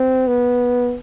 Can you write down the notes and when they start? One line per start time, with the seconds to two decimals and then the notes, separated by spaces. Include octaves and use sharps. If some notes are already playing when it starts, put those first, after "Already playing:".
Already playing: C4
0.28 B3